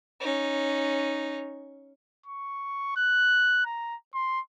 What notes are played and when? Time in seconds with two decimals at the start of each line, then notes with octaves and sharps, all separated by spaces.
0.20 C#4 D#4
2.26 C#6
2.97 F#6
3.65 A#5
4.14 C6